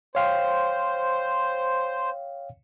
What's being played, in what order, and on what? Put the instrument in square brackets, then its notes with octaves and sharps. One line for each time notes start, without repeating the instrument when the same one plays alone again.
[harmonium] C5 [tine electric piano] C#5 F5 G5